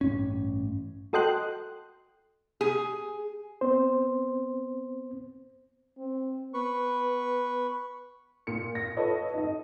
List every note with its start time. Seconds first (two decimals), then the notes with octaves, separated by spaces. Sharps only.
0.01 A1 G2 C#4
1.13 F#4 A4 D#5 G5 C6 F#6
2.61 G#4
3.61 B3 C4 C5
5.97 C4
6.54 B3 B4 C#6
8.47 A#2 C#7
8.75 A#6
8.97 F4 A4 B4 C#5 D#5
9.34 D#4 D#5